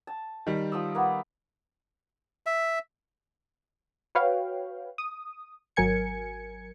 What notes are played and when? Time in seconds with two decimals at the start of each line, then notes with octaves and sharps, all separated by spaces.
0.07 A5
0.47 D#3 G3
0.72 F3 D#6 E6
0.95 A#3 B3
2.46 E5
4.15 F#4 B4 C#5 F5 G5
4.98 D#6
5.76 G#1 F#3 A#4 G#5 G#6 C#7